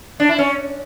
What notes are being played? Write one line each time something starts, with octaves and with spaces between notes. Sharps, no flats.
D4
E4
C#4